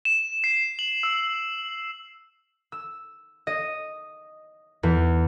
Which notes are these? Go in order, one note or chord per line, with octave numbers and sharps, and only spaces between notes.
E7
C7
F#7
E6
E6
D#5
E2